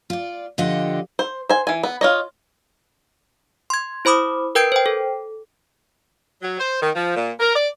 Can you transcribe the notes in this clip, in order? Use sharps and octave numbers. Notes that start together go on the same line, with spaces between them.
F4 D5
D3 F3 F4 G4 D#5 F#5
C5
C5 G#5
E3 G#5
B3
F4 C#5 D#5
C6 G#6
E4 C5 B5 D6 D#6
A#4 B4 G5 G6 G#6 D7
C5 G5
A4
F#3
C5
D#3
F3
A#2
A#4
D5